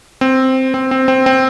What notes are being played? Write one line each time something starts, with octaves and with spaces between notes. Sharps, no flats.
C4
C4
C4
C4
C4